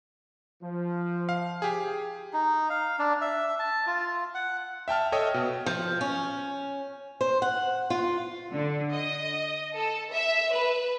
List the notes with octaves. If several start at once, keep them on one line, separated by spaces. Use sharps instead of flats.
F3
F5
G4 G#4
D#4
F5
D4
E5
A5
F4
F#5
E5 G5 A5 F6
A4 C#5 D#5 E5 G5 D#6
B2
F3
C#4
C5
F#5
F4
D3
D#5
A4
E5
B4